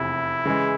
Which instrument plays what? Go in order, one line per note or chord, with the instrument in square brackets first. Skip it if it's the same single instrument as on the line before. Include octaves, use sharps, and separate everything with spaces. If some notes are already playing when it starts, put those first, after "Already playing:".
Already playing: [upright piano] F1 E2 C3 [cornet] E4
[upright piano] C#3 E3 G#3